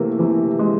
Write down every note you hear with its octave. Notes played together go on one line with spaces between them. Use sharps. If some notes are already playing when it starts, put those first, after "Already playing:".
Already playing: C3 E3 A3 A#3
C3 E3
G#3